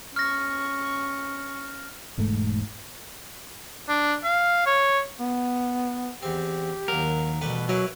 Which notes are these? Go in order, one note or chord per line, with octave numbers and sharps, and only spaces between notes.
C#4 C#6 F6 A#6
E1 G#2 A3
D4
F5
C#5
B3
E2 C4 G4
D#2 F#3 A#4
A1 B2 G3 B4
F#3 E4 A#4 B4